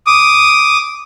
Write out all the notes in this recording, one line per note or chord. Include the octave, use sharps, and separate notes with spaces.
D6 D#6